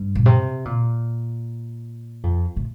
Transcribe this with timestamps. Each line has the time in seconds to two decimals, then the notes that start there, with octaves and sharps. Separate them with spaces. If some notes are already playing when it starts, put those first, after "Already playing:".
Already playing: G2
0.15 A#2
0.26 C3
0.65 A#2
2.23 F2
2.56 A2